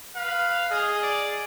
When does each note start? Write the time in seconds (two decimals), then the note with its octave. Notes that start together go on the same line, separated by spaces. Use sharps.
0.16 B4 F5
0.71 G#4 D#5
1.02 D5